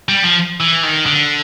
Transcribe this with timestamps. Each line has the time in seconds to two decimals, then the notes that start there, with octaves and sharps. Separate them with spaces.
0.09 G3
0.23 F3
0.60 E3
0.83 D#3
1.06 D3